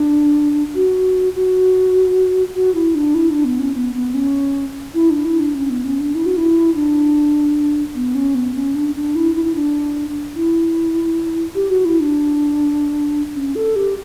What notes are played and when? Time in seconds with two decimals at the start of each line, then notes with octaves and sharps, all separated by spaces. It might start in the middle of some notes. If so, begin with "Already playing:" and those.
Already playing: D4
0.75 F#4
1.35 F#4
2.55 F#4
2.74 E4
2.95 D4
3.14 E4
3.30 D4
3.45 B3
3.60 C#4
3.75 B3
3.95 B3
4.14 C#4
4.94 E4
5.10 D4
5.25 E4
5.40 D4
5.55 C#4
5.70 B3
5.85 C#4
6.00 D4
6.15 E4
6.26 F#4
6.37 E4
6.75 D4
7.95 B3
8.15 C#4
8.35 B3
8.55 C#4
8.75 D4
8.95 D4
9.15 E4
9.35 E4
9.45 E4
9.55 D4
10.36 E4
11.55 G4
11.70 F#4
11.85 E4
12.00 D4
13.35 C#4
13.55 A4
13.76 G4